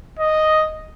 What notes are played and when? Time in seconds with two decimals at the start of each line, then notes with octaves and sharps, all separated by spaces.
0.19 D#5